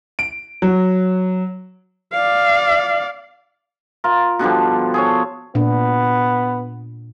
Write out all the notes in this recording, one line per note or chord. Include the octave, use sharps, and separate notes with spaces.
D7
F#3
D5 F5
F4 A#4
B2 D3 F3 G3
G#4 A4 C#5
A#2 B3 D4